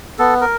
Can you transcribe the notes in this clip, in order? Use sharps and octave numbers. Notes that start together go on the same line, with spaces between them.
B3 A4
A#4